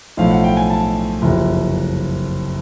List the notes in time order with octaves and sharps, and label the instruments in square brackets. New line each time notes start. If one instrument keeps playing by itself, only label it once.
[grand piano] B1 A2 F3 F5
F#5
G5
G#5
A5
F#1 F2 C3